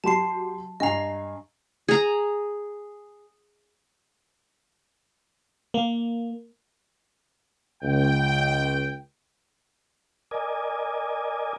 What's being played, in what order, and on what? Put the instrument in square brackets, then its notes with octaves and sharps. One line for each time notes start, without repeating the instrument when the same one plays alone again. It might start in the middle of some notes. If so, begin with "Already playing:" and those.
[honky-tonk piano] F#3 G4 C6 [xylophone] A5 C7
[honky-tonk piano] G2 G#5 C7 [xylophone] D#5 A#5
[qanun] G#4 A#5
[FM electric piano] A#3
[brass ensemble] C#2 G5
[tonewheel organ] A#4 D5 D#5 G#5